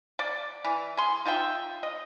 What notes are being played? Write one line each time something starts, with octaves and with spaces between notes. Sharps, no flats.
D5
E3
G#4 C6
D#4 F4 E5 G5
D#5